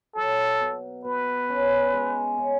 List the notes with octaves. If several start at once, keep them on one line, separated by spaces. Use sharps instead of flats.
F#3 A4
B2
B2 B4
C#4
G#3
C#3